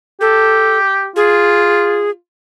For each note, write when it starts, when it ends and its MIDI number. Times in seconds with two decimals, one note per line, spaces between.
0.21 1.09 67
0.21 0.78 69
1.16 2.15 65
1.16 2.10 68